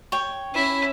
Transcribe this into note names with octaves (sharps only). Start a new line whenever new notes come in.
C#5 G5
C#4 E4